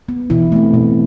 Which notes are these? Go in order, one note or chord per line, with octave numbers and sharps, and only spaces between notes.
B3
B2 E3 E4
A3 C4
B2